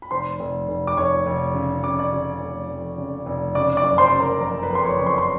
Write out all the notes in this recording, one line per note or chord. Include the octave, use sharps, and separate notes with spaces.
B5
F1 C5 C6
F1
F1
D6
F1 C#5 C#6
F1
C#3
C#3 D6
D5 D6
C#3
F1
F2
C#3
F1
C#3 D5 D6
D5 D6
F#1
C5 C6
C#3
A#4 A#5
F#1 A#4 A#5
B4 B5
F2 C6
C#5 C#6
F#1 C#6
C5 C6
C6